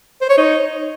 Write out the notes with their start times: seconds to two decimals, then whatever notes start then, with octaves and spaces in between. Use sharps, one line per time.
0.21 C5
0.29 C#5
0.38 D#4